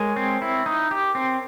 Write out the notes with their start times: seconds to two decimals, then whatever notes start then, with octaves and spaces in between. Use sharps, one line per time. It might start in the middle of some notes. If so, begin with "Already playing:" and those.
Already playing: G#3 A#4 C#5
0.16 C4
0.42 E4
0.66 D#4
0.91 G4
1.15 C4